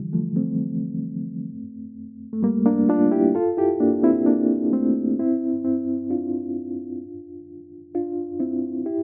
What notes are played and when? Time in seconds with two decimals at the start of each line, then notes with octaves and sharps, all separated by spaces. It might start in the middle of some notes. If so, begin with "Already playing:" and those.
Already playing: D3 E3 F3 G3
0.13 F3 A3
0.36 A3 C4
2.33 A3
2.43 G3 A#3
2.66 A#3 D4
2.89 D4 F4
3.11 E4 G4
3.35 F4 A4
3.57 E4 G4
3.80 A#3 D4
4.03 C4 E4
4.26 A#3 D4
4.73 A3 C4
5.19 C4 E4
5.65 C4 E4
6.10 D4 F4
7.95 D4 F4
8.40 C4 E4
8.86 E4 G4